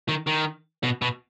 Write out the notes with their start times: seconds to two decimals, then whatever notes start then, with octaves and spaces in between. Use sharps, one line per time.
0.08 D#3
0.27 D#3
0.83 B2
1.02 B2